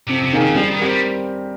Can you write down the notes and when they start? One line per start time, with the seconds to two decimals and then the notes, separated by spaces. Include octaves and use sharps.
0.08 F2 C3
0.25 C3
0.32 D#3 A#3 D#4 G#4
0.41 C#3
0.56 F3 G3
0.72 D#3
0.80 G#3 C4 G4 A#4
0.88 G3